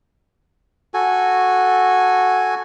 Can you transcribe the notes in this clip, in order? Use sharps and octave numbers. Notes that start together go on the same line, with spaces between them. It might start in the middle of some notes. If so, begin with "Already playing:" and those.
F#4 A4 G#5